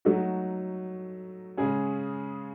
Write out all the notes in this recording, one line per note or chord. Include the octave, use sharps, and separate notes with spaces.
F#3 A3 D#4 F#4
C#3 G#3 C#4 G#4